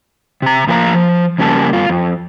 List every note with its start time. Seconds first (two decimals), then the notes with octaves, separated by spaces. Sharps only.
0.42 C3 A#5
0.67 A2 F3 A#3 B4 F5 A#5
0.94 F3
1.38 F2 C#3 G3 A#3 G#5 A5
1.73 G2 F4
1.89 F2